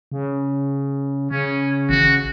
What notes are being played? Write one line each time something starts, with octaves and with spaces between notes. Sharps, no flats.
C#3
C#3 C#4
A1 F#4